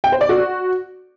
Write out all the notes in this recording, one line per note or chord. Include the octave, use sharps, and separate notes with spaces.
G5
C5
D5
F#4